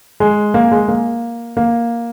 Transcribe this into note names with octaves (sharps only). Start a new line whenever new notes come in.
G#3
A#3
G#3
A#3
A#3